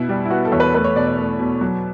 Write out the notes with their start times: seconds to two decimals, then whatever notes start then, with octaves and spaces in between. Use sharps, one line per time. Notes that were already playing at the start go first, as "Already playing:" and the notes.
Already playing: B2 E4
0.09 G3
0.25 E4
0.30 B3 F#4
0.45 A4
0.52 E2 C#5
0.60 B4
0.74 A3 B4
0.84 C#5
0.95 B2 D5
1.07 D5
1.17 A3
1.39 B2
1.61 F#3